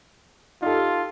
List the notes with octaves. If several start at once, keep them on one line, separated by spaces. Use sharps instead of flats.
D#4 F4 G4 A4